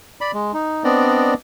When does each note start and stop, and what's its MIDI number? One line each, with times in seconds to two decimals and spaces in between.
0.21 0.32 74
0.21 0.32 83
0.33 0.52 56
0.53 0.83 63
0.84 1.34 59
0.84 1.34 60
0.84 1.34 62
0.84 1.34 74
0.84 1.34 75